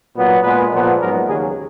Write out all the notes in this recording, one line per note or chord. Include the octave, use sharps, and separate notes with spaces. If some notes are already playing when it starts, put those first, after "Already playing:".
A#2 F#3 B3
A#2 G#3 B3 B4
A#2 F3 B3
G#2 F#3 B3 A#4
D#2 C#3 F#3 G#4